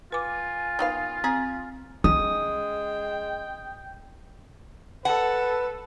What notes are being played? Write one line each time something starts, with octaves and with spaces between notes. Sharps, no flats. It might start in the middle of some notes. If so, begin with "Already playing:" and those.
F4 B4 G#5 D6
D#3 B3 F5
C4 G#4
G#3 C#4 G5 D#6
A4 B4 F#5